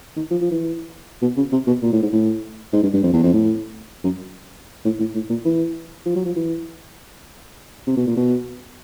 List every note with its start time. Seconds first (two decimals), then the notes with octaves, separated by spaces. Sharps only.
0.16 D#3
0.31 F3
0.41 F3
0.51 E3
1.22 B2
1.37 C#3
1.52 C3
1.67 B2
1.82 A#2
1.92 A2
2.02 G#2
2.13 A2
2.73 G#2
2.83 G2
2.93 G2
3.03 F2
3.13 E2
3.23 F2
3.33 A2
4.04 F#2
4.85 A2
5.00 A2
5.15 A2
5.30 A#2
5.45 E3
6.06 F3
6.15 F#3
6.25 F3
6.36 E3
7.87 C3
7.97 B2
8.07 A#2
8.17 B2